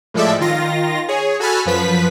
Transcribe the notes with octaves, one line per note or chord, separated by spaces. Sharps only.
A2 F3 G#3 A4 D5 E5
D#3 F4 A#6
G#4 C#5
F#4 A4 G#5 A5 B5 F6
F#2 F3 B4 B6